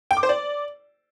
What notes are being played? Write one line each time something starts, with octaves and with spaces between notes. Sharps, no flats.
G5
D6
C5
D5